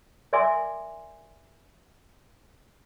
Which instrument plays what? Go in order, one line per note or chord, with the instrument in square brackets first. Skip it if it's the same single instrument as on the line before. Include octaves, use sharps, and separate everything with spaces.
[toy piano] A#4 D5 E5 G#5 C6 D6